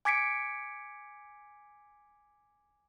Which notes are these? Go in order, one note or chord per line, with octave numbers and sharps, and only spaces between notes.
G#5 D6 G#6 B6 C#7 D7